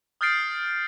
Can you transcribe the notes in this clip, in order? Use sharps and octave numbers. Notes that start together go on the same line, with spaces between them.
D#6 F6 G6 A6 C7 D7